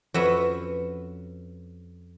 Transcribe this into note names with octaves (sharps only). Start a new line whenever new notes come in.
F2 C#4 F#4 B4 E5 F#5